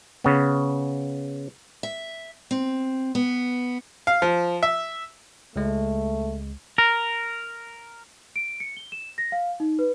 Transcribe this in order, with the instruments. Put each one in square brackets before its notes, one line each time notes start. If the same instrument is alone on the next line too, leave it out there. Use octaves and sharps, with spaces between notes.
[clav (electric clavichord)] C#3 B3
[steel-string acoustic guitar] E5
C4
B3
[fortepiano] F5
F3
E5
[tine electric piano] C#2 G#3 [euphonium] A3
[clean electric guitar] A#4
[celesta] D7
C#7
G7
E7
A#6
F5
D#4
B4